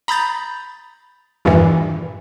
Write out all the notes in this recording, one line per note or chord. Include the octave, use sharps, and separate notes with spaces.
A#5 B5 D#6 G6 A6
E2 G2 A#2 D#3 E3